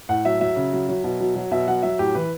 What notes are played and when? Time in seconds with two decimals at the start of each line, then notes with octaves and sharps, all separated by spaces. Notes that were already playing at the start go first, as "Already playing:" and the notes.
0.09 A2 F#5
0.25 F#3 E5
0.41 F#3 E5
0.56 C#3
0.73 F#3
0.89 F#3
1.04 B2
1.21 F#3
1.36 F#3
1.51 B2 E5
1.67 F#3 F#5
1.83 F#3 E5
1.99 A2 G4
2.15 E3 B4